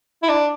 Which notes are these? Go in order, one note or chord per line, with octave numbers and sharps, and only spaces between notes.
E4
D4